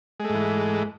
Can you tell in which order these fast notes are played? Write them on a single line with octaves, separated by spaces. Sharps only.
G#3 A3 G#2 E3